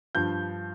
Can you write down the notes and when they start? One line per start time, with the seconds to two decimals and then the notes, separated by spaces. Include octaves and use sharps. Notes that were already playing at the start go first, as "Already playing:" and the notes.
0.15 G2 F3 G6